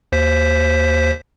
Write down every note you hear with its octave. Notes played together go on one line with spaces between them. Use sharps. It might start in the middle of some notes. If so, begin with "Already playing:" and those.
D#2 C5 B6